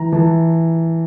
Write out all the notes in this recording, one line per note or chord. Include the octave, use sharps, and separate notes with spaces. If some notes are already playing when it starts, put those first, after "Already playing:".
Already playing: E3 A#5
E3 A5